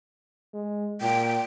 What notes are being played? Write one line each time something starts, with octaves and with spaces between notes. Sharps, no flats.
G#3
A#2 G5